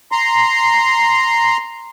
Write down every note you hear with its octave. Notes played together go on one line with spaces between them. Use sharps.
A#5 C6